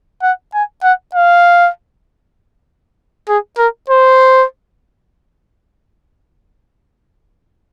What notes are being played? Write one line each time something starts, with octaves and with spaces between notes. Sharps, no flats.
F#5
G#5
F#5
F5
G#4
A#4
C5